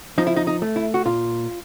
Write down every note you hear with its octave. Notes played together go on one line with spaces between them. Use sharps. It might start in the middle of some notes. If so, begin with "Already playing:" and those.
F3 D#4
E4
D#4
D#4
A3
E4
F#4
A#2 F4